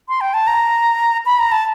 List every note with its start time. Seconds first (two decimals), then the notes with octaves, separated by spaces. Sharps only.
0.09 C6
0.21 G5
0.34 A5
0.47 A#5
1.26 B5
1.39 A#5
1.52 A5